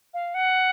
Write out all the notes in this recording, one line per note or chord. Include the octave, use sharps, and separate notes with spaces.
F5
F#5